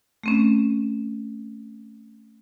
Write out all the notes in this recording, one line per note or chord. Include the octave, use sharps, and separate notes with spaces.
A3 C4 C#4